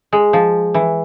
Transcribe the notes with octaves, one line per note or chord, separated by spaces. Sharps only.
G#3
F3
E3